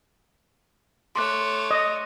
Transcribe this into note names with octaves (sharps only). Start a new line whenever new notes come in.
A3 C#5 C6 D6 F#6
D#5